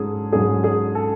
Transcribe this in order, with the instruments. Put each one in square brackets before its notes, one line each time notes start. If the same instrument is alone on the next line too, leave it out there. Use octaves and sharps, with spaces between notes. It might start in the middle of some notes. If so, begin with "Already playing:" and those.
Already playing: [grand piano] G#2 F#3 C#4 [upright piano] G#4 A4
[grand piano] G#2 F#3 C#4 [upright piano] G#4
[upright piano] G#4
A4